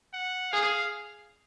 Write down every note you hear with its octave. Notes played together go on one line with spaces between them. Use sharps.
F#5
G#4 F5